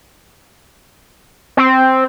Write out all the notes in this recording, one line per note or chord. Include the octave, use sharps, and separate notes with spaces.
C4